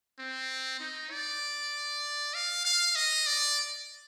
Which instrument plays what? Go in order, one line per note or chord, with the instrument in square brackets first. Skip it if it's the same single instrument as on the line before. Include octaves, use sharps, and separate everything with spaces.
[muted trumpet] C4
D#4
D5
F5
F5
D#5
D5